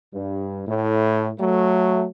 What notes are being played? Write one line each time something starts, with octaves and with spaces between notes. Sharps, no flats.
G2
A2
F#3 A3